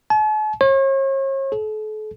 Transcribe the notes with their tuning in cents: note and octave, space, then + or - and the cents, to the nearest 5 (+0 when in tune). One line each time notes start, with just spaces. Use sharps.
A5 -45
C#5 -40
A4 -40